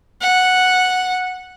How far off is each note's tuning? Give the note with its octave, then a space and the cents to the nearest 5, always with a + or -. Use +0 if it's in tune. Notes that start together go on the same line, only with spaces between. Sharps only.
F#5 -5